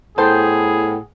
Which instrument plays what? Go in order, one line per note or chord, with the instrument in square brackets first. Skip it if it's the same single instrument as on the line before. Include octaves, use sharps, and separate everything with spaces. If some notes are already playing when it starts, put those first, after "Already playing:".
[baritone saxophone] A2 [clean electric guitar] B3 G5 [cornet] G#4 [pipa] A4 C5